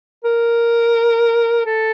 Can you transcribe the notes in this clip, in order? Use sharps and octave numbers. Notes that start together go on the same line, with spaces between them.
A#4
A4